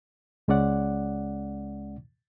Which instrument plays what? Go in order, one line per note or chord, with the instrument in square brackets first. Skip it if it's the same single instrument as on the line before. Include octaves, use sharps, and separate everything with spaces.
[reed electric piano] C#2 G#3 C#4 D5 F#5